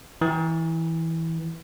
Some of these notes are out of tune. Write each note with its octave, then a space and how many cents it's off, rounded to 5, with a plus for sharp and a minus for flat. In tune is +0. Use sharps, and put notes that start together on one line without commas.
E3 -15